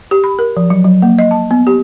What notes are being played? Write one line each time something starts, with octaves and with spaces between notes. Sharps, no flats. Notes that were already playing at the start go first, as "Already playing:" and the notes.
G4
B5
A#4
F3
F#3
F#3
A#3
D#5
A5
B3
G4